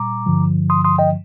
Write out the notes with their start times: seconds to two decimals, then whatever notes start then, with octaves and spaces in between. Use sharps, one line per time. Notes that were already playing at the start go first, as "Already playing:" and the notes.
Already playing: A#2 G3 A#5 D6
0.26 G2 D3 F3
0.70 C6 D#6
0.84 C6 D#6
0.98 D#5 G5